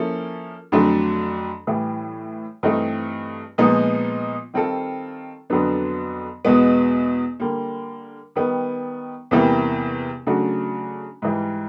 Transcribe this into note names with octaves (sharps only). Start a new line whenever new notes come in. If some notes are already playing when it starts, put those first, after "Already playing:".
Already playing: F3 A#3 C#4 E4 A4
F2 D3 F#3 A3 D4
A2 E3 G3
G2 E3 A3 C4 D#4
A#2 F3 G#3 B3 D#4
D#3 G3 C4 F4 A4
F2 D3 F#3 B3 D4
E2 B2 G#3 B3
D3 G3 A#3
D#3 G3 B3
E2 C3 E3 G3 A#3
C#3 F#3 A3 D4 F#4
G#2 E3 G3